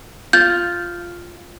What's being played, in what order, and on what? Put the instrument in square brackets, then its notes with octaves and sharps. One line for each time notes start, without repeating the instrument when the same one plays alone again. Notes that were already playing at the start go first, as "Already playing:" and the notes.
[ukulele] F4 [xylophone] G6